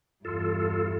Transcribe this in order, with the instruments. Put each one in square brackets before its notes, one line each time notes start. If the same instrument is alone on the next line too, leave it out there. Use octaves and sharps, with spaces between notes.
[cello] E2 G2 [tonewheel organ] F4 A4